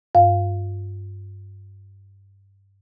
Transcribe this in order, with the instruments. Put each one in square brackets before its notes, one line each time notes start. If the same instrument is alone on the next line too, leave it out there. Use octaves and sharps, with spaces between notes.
[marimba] G2 F5